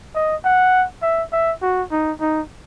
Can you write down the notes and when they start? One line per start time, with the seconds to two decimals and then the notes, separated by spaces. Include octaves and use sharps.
0.15 D#5
0.45 F#5
1.02 E5
1.32 E5
1.62 F#4
1.91 D#4
2.21 D#4